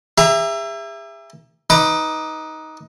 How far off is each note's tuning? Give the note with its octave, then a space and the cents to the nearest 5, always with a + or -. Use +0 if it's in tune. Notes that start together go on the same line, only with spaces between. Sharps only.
G#4 -45 E5 +20 A#5 +10
D#4 +15 B4 +0 D6 +30